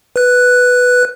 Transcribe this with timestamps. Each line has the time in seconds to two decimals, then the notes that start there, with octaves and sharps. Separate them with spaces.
0.16 B4 F#6